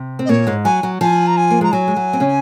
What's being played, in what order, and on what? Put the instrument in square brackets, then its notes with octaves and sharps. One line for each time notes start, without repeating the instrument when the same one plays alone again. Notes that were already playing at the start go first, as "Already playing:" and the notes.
Already playing: [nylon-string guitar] C3
C4
[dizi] D#5
[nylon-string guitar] A#2 A#3 [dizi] C#5
[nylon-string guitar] G#2 G#3
[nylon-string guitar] F#3 [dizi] G#5
[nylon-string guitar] F#3
[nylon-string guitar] F3 [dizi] G#5
[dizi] A#5
G#5
[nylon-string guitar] A#3
[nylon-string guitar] G#3 [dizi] A#5
[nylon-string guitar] F#3 [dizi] G#5
[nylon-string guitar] G#3
F#3
C4
C#3 C#4